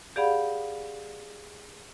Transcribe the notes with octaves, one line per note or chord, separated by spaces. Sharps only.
G4 G#4 D5 F5 F#5 B5